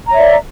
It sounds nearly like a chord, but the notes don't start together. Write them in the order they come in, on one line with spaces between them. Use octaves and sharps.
A#5 C#5 E5 D5